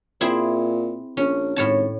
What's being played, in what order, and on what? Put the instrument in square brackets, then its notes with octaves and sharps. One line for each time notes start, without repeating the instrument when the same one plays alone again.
[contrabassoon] A#2 [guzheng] C4 E4 G#4
[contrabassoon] A#1 [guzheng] C#4
[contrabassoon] G#1 [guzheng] A2 C#5 A5